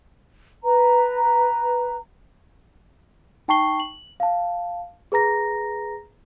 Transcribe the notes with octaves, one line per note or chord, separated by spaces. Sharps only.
B4 A#5
D#4 G5 A5 C#6 C7 G7
F#7
F5 A5
G#4 B4 A#5 A#6